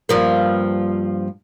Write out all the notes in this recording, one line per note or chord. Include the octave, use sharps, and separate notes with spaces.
G2 F3 A#3